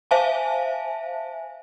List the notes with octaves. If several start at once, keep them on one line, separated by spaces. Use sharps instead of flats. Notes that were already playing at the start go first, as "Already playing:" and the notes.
C5 E5 F5 G#5 A5